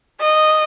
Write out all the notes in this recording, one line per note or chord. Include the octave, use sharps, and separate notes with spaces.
D#5